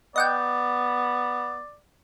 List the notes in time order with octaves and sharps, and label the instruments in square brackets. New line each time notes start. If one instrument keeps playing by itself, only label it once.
[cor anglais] B3 [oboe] D5 [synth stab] D#5 F#5 G5